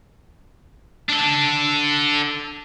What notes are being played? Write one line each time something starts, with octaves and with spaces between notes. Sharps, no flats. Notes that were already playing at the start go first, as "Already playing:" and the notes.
D4 A4